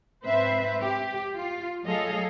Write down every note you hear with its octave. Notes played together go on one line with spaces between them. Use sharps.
G#2 C4 B4 C5 E5
G4
F4
F#3 A3 G#4 A4 D#5 F5